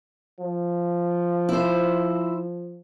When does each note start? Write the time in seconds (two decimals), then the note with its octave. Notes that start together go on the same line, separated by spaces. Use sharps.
0.40 F3
1.49 E4 C5